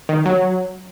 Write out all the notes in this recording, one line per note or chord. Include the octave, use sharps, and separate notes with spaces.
D#3
F#3